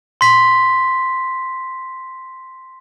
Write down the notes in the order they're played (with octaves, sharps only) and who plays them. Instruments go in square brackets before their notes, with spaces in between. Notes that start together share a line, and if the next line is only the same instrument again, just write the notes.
[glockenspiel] C6 B6